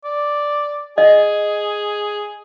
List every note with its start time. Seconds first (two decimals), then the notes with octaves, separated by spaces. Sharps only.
0.04 D5
0.98 G#4 D#5